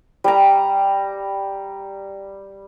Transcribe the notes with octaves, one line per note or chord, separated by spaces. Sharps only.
G3 A#5